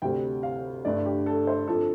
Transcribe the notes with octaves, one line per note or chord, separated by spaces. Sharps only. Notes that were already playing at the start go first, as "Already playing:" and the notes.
D2 C3 G3 G5
F5
G2 D3 A3 D5
G4
A4
C5
F2 D3 F3 A4